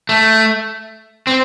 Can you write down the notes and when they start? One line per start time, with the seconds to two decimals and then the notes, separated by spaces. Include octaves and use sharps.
0.09 A3
1.27 C4